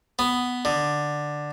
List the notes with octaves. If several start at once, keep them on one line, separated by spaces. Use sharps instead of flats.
B3
D3